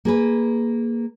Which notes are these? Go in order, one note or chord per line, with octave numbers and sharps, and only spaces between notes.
A#3 G#4 B4